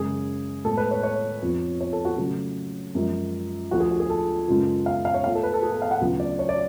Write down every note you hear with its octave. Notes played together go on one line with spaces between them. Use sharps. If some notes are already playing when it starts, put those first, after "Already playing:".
Already playing: F#2 C#3 G#3 G#4
A2 G#3 B3 A4
B4
C#5
C#5
F2 F3 B3
C#5
A4
F#4
C#3 F#3 A3
F#2 F3 G#3
D2 D3 F3 F#4
G#4
F#4
G#4
A4
F#2 C#3 G#3 B3 F4
F5
F5
C#5
B2 A3 F4 F5
A4
B4
A4
G#4
A4
F5
F#5
D2 C#3 F#3 B3 F4
D5
C#5
D5